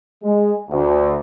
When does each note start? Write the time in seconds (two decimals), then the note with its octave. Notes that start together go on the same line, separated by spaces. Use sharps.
0.24 G#3
0.70 D2